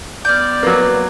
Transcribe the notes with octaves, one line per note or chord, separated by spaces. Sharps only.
B3 D5 F6 G6
F#3 A#3 B4